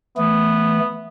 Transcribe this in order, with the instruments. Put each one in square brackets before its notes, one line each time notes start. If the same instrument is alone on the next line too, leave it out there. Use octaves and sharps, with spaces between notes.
[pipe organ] E3 A3 [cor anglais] B3